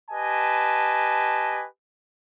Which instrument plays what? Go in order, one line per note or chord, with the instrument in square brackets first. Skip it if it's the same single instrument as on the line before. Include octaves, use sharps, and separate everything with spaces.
[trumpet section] G4 B4 D#5 G#5 A5